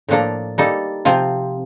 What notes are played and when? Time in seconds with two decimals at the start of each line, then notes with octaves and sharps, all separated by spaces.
0.09 A2 F3 A#3 D4 A4
0.58 G3 A#3 D#4 A4
1.05 C3 F3 C4 F4